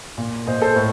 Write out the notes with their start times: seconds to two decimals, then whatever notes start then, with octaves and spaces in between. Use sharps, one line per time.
0.18 A#2
0.47 A#2 C5 D#5
0.62 A4 C5
0.76 A2